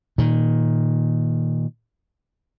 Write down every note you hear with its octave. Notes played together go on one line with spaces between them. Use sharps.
A#2 D#3